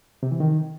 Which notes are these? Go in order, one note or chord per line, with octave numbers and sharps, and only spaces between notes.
C3
E3
D#3